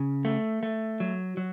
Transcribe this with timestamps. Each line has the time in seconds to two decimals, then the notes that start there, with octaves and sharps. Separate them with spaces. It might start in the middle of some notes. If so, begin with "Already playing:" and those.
Already playing: C#3
0.25 A3
0.63 A3
1.00 F#3
1.37 F#3